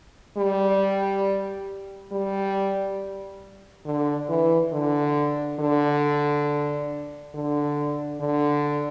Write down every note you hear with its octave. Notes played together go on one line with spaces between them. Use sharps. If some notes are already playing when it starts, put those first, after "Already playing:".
G3
G3
D3
E3
D3
D3
D3
D3